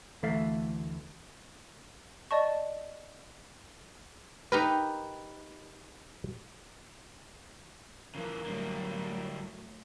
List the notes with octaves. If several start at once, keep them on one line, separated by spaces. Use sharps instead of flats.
D2 E3 A3 A4 E5 F5
D5 D#5 A5 C#6
D#4 G4 A#4 B4
C#3 E3 F3 A#3
A2 D3 F#3 G3